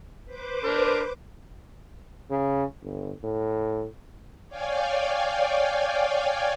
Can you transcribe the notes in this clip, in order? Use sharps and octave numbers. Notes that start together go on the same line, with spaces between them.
B4 C5 D6
D4 A#4
C#3
G1
A2
C#5 D5 F5 G5 G#5